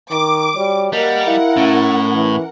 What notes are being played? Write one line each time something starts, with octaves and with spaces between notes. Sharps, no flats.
D#3 D6
G3 F#4 C#5
G3 A#3 G4 A#4 D#5 F#5 A5
E4 F5
A2 C#4
E3